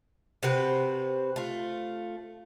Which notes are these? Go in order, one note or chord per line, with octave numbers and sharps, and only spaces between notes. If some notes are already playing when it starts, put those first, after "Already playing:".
C3 C4 F#4 B4
A3 F4